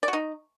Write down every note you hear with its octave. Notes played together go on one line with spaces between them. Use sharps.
D5
F#4
D#4